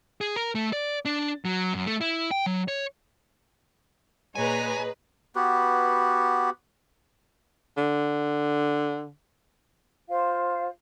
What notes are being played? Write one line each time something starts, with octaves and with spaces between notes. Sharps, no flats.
G#4
A#4
A3
D5
D4
F#3
F#2
A3
E4
G5
F#3
C#5
A#2 G#4 B4 C#5 D#5 G#5 A#5
B3 F#4 G4 B4
D3
F4 C5 F5